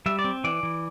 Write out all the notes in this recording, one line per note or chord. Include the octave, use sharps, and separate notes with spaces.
G3 E5
D5
C4
E3 D5
E3